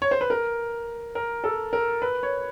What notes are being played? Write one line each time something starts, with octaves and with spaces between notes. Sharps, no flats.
C#5
C5
B4
A#4
A#4
A4
A#4
B4
C#5